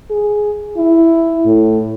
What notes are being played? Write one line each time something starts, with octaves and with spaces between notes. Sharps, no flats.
G#4
E4
A2